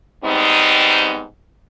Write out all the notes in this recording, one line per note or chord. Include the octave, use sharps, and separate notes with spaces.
G#2 G3 B3 C4 D#4